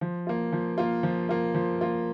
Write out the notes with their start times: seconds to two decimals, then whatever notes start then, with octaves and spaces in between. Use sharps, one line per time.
0.01 F3
0.27 A#3 F4
0.52 F3
0.78 A#3 F4
1.03 F3
1.29 A#3 F4
1.54 F3
1.81 A#3 F4